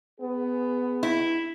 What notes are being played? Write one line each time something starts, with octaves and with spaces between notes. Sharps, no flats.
B3 G#4
E4